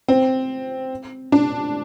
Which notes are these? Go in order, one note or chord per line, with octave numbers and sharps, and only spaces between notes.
C4
D4